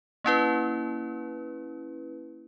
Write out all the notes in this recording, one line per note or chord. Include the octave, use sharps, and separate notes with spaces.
A#3 C#4 E4 B4